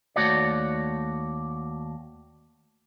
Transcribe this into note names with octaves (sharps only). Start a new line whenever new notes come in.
D#2 E3 A3 F#4 C#5 D5